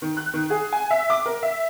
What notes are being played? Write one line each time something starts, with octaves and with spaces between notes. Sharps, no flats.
D#3
F#6
D#3
G#4
G#5
E5
D6
A#4
E5